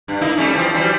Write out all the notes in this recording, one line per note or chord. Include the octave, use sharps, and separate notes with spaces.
G2
A#3 D#4 E4
G3 A3 C#4
E3 F3 C4
E3 F#3 G3